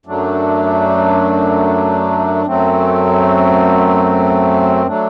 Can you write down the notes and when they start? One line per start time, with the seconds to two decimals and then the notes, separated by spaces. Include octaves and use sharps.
0.06 F#2 F#3 A3 D4
2.46 F#2 F#3 A3 C4
4.87 F#3 A3 D4